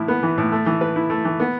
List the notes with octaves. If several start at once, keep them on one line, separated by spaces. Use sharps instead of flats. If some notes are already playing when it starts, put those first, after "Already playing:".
Already playing: A2 E3 E4
B3
E3
A2
A3
E3
B4
E4
A3
E3
B3